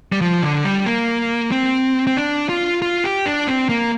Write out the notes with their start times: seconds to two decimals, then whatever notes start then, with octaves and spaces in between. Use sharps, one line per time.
0.12 G3
0.21 F3
0.43 D3
0.65 G3
0.86 A#3
1.52 C4
2.07 C4
2.17 D4
2.49 F4
2.82 F4
3.04 G4
3.26 D4
3.48 C4
3.69 A#3